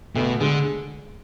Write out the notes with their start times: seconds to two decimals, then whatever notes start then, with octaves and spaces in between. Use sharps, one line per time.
0.15 D2 B2
0.41 D3 G#3